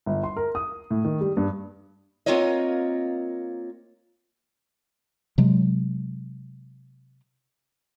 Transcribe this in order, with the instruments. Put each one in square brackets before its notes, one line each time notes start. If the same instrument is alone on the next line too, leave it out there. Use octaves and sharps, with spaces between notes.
[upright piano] G1
C6
A#4
D#6
A2
D#3
G3
G2
[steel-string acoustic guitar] A#3 C4 F4 A#4 C#5 D#5
[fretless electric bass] C3 F#3 G#3